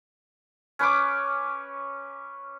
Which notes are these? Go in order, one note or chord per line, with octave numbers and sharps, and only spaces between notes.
C#4 B4 C#5 D6